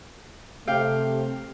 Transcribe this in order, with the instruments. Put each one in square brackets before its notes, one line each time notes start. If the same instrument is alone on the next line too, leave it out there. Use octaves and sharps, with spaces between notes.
[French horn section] C3 A3 [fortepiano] G4 F5 G5